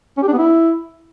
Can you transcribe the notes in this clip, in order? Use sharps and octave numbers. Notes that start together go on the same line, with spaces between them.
C#4
G4
D4
B3
E4